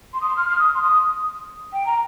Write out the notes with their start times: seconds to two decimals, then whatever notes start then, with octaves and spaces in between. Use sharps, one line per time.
0.13 C6
0.21 D#6
0.28 C6
0.36 F6
0.49 F6
0.58 D#6
0.74 C6
0.81 D#6
1.72 G5
1.85 A#5